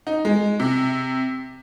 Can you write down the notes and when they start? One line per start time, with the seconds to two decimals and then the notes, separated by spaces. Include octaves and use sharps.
0.07 D#4
0.25 G#3
0.60 C3